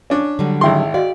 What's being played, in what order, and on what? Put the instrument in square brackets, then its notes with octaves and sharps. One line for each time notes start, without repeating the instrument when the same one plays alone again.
[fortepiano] C#4 D4
[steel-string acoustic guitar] D3 F#3 G3
[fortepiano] G#1 E4 C6 [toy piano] G#4 G5
[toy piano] F#4 D#5 F5 [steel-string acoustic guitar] D5